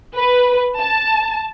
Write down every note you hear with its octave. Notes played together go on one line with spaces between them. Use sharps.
B4
A5